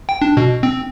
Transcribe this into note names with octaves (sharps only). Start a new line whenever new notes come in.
G5
D4
B2
C4